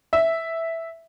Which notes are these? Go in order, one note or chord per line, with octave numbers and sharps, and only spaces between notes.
E5